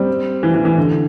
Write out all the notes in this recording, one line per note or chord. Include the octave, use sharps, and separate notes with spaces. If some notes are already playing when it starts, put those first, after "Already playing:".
Already playing: G3 C4
E3
E3
E3
D3